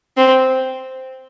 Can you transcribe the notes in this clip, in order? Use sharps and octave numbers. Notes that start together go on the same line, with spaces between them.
C4